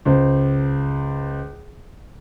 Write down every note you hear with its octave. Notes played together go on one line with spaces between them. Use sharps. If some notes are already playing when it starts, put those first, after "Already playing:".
C#2 C5